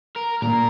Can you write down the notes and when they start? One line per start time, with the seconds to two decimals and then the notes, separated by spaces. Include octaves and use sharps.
0.16 A#4
0.42 A#2 A#4